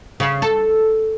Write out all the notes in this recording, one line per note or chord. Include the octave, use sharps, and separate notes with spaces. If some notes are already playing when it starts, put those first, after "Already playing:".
C#3
A4